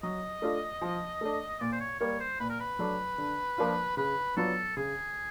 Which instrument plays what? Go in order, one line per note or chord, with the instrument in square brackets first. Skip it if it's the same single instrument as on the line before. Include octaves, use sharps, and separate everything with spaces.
[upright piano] F#3 [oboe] D#5
[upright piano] A3 D4 F4
F3
A3 D4
[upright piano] A#2 [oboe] D5
[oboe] C5
C#5
[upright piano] G3 A#3 [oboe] C#5
[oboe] C5
[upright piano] A#2 [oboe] B4
[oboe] A#4
B4
[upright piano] F#3 A3 D4
D3
F3 A#3 D4 F4
[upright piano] C#3 [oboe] B4
[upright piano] F#3 B3 D4 F4 [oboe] A4
[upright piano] C#3 [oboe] G#4